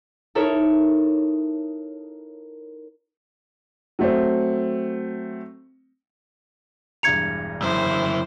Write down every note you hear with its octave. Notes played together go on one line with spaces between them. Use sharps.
D#4 E4 A4 A#4 C#5
F#3 A3 C4
E1 G2 A#5 G#6 C#7 F7
F#2 E4 C5